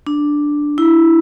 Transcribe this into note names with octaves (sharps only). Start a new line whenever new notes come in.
D4
E4